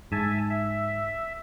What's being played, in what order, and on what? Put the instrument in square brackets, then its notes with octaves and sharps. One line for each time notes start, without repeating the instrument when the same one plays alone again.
[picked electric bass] G#2 [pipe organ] E5 G#5 A5
[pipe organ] E5